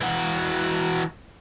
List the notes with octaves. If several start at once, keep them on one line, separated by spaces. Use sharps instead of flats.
E3 F#4